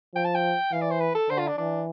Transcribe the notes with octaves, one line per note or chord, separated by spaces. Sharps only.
F3 G5
A5
G5
E3 F5
D5
C5
B4
A4
D3 C5
F4
D4
E3 D4